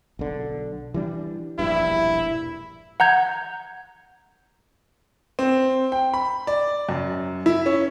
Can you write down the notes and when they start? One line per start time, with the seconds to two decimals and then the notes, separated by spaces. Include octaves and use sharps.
0.19 B1 D3
0.94 E3 G3 D4
1.59 E1 A#1 G2 E4
3.00 F#5 A#5 G6 G#6
5.39 C4
5.92 G5
6.14 B5
6.47 D5
6.89 F#2
7.46 E4
7.66 C#4